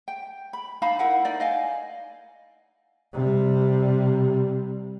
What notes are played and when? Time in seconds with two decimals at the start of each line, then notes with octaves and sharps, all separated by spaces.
0.08 G5
0.53 B5
0.82 D#4 F5 A5 B5
0.99 E4 A#4 F#5
1.25 D#4 D5
1.40 D#5 F5 G#5
3.13 C3 G3